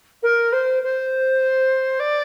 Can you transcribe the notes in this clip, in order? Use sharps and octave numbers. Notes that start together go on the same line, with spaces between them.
A#4
C5
C5
D5